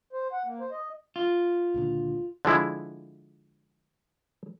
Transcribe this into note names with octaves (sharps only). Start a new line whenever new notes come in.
C5
F#5
A#3
C5
D#5
F4
C#2 A#2 D3
D3 F3 G#3 E4